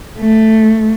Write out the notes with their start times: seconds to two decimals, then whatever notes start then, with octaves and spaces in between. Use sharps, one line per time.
0.19 A3